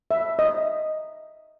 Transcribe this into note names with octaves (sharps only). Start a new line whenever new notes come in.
E5
D#5